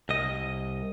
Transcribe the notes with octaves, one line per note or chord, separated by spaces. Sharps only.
C2 D#5